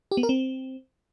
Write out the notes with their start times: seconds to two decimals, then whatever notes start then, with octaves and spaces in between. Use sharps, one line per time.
0.11 G4
0.17 B3
0.23 A#4
0.29 C4